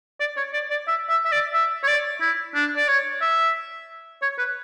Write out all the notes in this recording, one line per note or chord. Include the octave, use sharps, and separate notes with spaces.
D5
C#5
D5
D5
E5
E5
E5
D5
E5
C#5
D5
E4
D4
D5
C#5
E5
C#5
B4